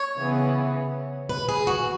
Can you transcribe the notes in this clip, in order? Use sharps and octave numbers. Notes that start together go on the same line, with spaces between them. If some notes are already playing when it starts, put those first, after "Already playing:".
Already playing: C#5
C#3 E3 B3 G#4
B4
G#4
F#3 F#4